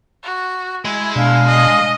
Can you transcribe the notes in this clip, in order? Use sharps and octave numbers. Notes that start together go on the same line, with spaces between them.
F#4
G#3 E4
B2 D4 F5
D#5